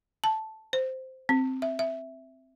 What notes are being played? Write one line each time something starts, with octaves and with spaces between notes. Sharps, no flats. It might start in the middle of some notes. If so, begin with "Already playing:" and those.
A5
C5
C4
E5
E5